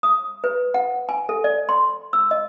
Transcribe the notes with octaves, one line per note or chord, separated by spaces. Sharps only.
D#6
B4
F#5
G#5
A4
D5
C6
E6
D#5